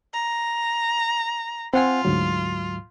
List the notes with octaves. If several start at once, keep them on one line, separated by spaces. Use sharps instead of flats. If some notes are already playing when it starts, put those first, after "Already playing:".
A#5
C4 F4 F#5 G#5
D2 G#2 F#3